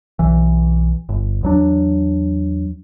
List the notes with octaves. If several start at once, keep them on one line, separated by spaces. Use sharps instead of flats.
B1 E3
G1
E2 F#3 D4